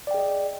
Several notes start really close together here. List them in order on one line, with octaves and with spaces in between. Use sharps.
D5 G5 G#4 D#5